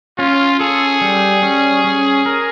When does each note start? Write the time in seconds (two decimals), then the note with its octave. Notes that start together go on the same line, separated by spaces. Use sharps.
0.18 C#4 F4
0.60 G#4 A4
1.01 G3
1.43 C#4
1.84 C#4
2.26 A#4